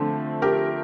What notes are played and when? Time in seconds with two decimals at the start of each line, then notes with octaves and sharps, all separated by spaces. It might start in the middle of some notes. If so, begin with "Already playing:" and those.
Already playing: D3 F3 A3 C4
0.42 G4 A#4